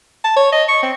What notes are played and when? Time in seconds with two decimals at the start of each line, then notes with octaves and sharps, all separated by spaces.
0.24 A5
0.36 C#5
0.52 D#5
0.68 C#6
0.83 C4